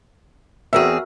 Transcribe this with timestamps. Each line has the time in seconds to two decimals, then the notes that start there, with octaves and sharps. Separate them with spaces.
0.73 E2 C4 F#4 G#4 A#4 E5